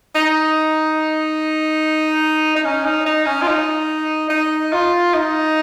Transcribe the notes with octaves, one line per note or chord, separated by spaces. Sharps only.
D#4
D#4
C#4
D#4
D#4
C#4
F4
D#4
D#4
F4
D#4